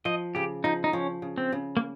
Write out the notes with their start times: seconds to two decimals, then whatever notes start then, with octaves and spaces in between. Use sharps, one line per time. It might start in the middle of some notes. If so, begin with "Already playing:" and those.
0.05 F3 D#5
0.35 C#3 G4
0.64 F3 D#4
0.84 D#4
0.93 F3 C#4
1.22 C#3
1.38 C4
1.52 C#3
1.77 A#3